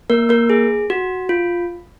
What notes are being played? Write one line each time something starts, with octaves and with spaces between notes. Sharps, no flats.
A#3 A#4
A#3 A#4
G#4
F#4
F4